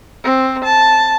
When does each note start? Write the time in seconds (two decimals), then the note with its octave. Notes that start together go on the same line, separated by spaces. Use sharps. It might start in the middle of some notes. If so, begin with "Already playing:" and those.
0.24 C4
0.64 A5